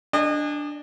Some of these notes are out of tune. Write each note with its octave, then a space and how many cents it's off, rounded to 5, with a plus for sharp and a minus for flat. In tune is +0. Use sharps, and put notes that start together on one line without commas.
D4 +0 D#5 -30 G#5 -35